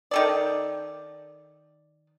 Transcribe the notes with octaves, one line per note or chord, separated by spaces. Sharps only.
D#3 A4 D5